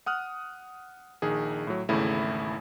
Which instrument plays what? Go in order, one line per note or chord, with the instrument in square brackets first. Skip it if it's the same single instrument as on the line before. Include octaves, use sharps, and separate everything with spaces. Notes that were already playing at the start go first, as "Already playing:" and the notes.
[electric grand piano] F#5 D#6 F6 F#6
A#1 D#3 G#4
A2 F#3
G#1 E2 C#3 A3 E4